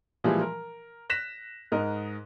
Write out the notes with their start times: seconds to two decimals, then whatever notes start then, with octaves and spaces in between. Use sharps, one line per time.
0.24 A#2 E3 F3 G3 G#3
0.41 A#4
1.10 F#6 A#6 B6 E7
1.72 G#2 A#4 D#5